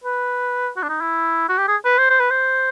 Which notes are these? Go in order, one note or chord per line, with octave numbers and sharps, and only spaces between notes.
B4
F#4
D4
D#4
E4
F#4
G4
G#4
B4
C5
C5
B4
C5